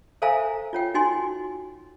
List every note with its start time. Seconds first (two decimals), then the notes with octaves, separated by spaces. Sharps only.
0.22 A4 C5 E5 F5 G#5 A#5
0.73 F4 C#5 G5
0.94 D#4 F#4 G#5 C6